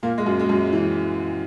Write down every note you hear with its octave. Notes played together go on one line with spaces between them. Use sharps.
A#2 A#3
G#3
F#2 F#3
G#3
F#2 F#3
E3